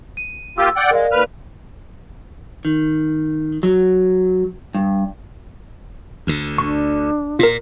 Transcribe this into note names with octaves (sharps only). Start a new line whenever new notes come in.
D#7
A#3 F4 G4 E6
D5 F#5 G5
G#3 A#4 D5 F5
D#2 B4 F6
D#3
F#3
G2
D2 D3
D4 C#6
A#2 F4 A#4